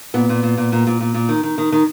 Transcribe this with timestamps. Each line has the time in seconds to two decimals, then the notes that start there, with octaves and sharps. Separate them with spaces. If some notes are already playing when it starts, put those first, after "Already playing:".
0.14 A#2 B3
0.29 A#2
0.43 A#2
0.57 A#2
0.72 A#2
0.87 A#2
1.01 A#2
1.14 A#2
1.29 D#3
1.43 D#3
1.58 D#3
1.72 D#3